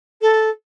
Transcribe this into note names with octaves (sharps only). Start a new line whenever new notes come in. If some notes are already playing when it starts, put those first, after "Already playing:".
A4